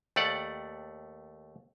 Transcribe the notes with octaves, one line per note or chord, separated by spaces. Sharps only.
D#2 A3 D5 F#5